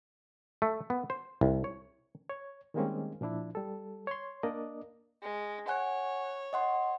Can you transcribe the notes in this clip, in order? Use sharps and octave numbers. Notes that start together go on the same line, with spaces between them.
A3
B3
C5
C2
C#5
C#5
D#3 G3 G#3 A#3 C4 C#4
A#2 F3 D4 E4
G3 A4
C#5 C6
A#3 D4 A#4 D5 D#5
G#3
C#5 F#5 G#5 F#6
D#5 F#5 C6